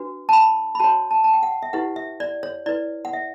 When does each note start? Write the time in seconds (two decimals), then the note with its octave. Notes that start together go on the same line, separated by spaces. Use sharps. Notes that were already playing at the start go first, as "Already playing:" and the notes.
Already playing: D4 F#4 B4
0.29 A5
0.33 B5
0.75 B5
0.80 F#4 C#5 A5
1.11 A5
1.24 A5
1.33 G5
1.43 F#5
1.63 E5
1.73 E4 G4 B4 F#5
1.96 E5
2.20 D5
2.43 C#5
2.66 E4 B4 D5
3.05 F#5
3.13 E5